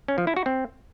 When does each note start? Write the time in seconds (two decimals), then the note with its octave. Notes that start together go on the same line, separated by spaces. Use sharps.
0.08 C#4
0.18 F3
0.27 E4
0.37 F#4
0.46 C4